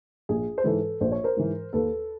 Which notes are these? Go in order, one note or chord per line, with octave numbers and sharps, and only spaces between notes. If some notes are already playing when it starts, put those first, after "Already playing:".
A#1 G#4
C5
G#2 E3 A4 B4
A#1 C5
C#5
A#4 C5
G#2 E3
D#2 A4 B4